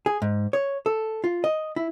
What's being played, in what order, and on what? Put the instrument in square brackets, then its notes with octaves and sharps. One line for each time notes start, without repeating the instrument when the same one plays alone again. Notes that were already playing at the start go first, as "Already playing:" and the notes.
[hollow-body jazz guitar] G#4
G#2
C#5
A4
F4
D#5
E4